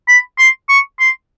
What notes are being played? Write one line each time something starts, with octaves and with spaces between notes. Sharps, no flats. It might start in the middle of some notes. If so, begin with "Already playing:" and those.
B5
C6
C#6
C6